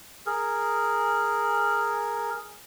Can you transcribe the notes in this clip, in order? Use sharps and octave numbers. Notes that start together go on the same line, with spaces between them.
G#4 A#4